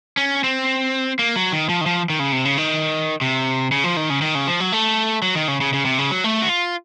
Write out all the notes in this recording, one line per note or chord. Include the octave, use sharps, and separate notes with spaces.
C#4
C4
A#3
F#3
D#3
F3
D#3
F3
D#3
C#3
C3
C#3
D#3
C3
C#3
F3
D#3
C#3
D#3
C#3
F3
F#3
A3
F#3
D#3
C#3
C#3
C#3
C3
C#3
F#3
A3
F#4
F4